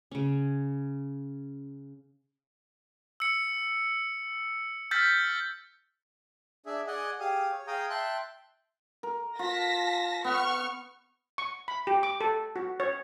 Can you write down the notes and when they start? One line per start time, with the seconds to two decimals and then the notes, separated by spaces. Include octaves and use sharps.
0.11 C#3 C#4
3.20 E6 C#7
4.91 E6 F6 G6 A6 B6
6.66 D4 G#4 E5
6.87 G#4 D5 D#5 F#5 G#5
7.20 G4 G#4 F5 D#6
7.52 C#5
7.67 G#4 F5 G5 A#5 D#6
7.90 E5 G5 A5 C6 F#6
9.03 A#4
9.39 F4 A5 A#6 B6
10.24 B3 F#5 C#6 F6
11.38 C#6
11.68 B5
11.87 G4
12.03 D6
12.21 A4
12.56 F#4
12.80 C#5